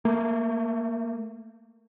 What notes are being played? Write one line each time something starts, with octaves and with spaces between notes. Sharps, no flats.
A3 A#3